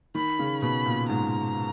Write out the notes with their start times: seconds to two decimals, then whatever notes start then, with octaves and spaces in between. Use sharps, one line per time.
0.15 D#3 B5
0.39 C#3
0.62 B2 B5
0.85 A#2
1.09 G#2 A#5